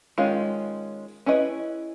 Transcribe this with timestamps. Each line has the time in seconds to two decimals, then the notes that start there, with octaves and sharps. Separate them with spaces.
0.18 D#3 G#3 C#4 F4
1.26 C#4 E4 G#4 B4 D#5